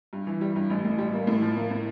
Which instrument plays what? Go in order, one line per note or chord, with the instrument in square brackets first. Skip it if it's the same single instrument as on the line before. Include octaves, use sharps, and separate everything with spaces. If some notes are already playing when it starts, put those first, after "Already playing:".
[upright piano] G2
E3
G3
G2
A1
A2
G3
A#3
A2
F3
A#3
A2